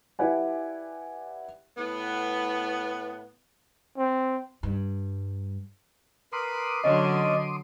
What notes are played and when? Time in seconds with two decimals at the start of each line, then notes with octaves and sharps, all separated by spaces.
0.19 E4 G4 B4 D5 F#5 G#5
1.77 A2 B3
3.98 C4
4.63 G2
6.33 A#4 B4 B5 C6 D6 D#6
6.84 D3 F#3 C#4 D5 D#5